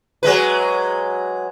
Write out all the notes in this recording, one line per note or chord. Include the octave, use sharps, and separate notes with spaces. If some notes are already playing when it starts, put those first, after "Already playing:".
F#3 G#3 B4